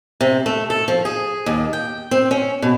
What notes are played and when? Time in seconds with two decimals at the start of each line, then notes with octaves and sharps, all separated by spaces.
0.21 C3
0.46 A3
0.70 A4
0.88 F3
1.05 G#4
1.46 D#2
1.73 G5
2.11 C4
2.31 C#4
2.62 B2